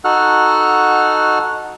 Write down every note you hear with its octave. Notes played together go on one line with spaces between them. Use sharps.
D#4 F#4 A4 F#5 F6 F#6